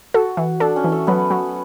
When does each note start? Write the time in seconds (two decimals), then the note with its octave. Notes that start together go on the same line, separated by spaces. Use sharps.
0.14 F#4 A4
0.37 E3
0.60 D4 A4
0.76 C#4
0.84 E3
0.92 A3
1.07 F#3 B3
1.30 F#3